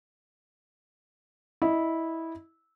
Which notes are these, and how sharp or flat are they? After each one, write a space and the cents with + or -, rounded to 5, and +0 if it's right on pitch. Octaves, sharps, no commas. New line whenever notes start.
E4 -15 D#5 -15